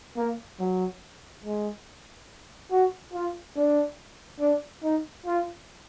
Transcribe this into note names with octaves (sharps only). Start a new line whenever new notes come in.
A#3
F#3
G#3
F#4
F4
D4
D4
D#4
F4